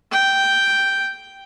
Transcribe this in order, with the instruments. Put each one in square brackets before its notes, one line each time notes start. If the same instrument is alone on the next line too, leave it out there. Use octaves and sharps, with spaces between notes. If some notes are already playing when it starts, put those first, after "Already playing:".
[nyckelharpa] G5